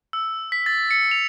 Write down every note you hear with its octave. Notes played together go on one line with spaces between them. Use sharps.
E6
B6
A6
C#7
F7